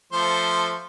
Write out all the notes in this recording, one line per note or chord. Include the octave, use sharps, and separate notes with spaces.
F3 A3 C5